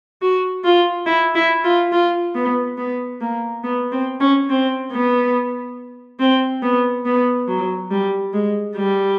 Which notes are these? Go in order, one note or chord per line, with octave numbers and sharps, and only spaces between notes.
F#4
F4
E4
E4
F4
F4
B3
B3
A#3
B3
C4
C#4
C4
B3
C4
B3
B3
F#3
G3
G#3
G3